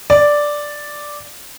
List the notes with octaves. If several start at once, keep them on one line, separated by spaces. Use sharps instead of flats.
D5